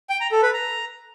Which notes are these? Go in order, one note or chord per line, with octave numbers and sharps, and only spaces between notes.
G5
A#5
A4
B4
A#5